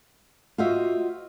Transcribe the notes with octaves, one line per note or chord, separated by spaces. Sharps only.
F4 F#4 C5 D#5 E5